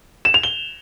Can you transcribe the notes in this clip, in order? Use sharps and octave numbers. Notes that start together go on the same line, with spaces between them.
E7
F7
G7